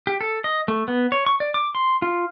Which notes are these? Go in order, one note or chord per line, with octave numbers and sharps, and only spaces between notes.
G4
A4
D#5
A3
B3
C#5
C#6
D5
D6
C6
F4